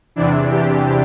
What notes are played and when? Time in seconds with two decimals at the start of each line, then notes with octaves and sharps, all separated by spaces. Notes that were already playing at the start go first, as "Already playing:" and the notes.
0.16 E2 C3 E3 D4
0.51 G4